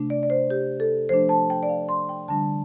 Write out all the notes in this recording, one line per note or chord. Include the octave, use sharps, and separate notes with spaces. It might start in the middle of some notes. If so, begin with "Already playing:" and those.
Already playing: C3 A3 D4
D5
D5
C5
G4
A4
F3 A3 D4 C5
A5
G5
D5
F5
C6
G5
D3 G3 D4 A5